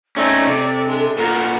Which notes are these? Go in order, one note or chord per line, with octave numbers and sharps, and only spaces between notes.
A3 C4 C#4 D#4 D5
C3 A4 D5
G#3 D4
A#2 B3 A#4